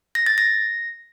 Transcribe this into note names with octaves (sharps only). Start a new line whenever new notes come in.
A#6
A6
A#6